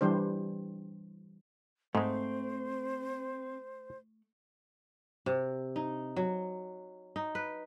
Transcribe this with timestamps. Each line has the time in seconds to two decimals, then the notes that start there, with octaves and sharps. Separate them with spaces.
0.01 E3 G3 D4 C5
1.95 G#2 G#3 A3 C4 C5
5.26 C3
5.76 D#4
6.16 F#3
7.16 D#4
7.35 B4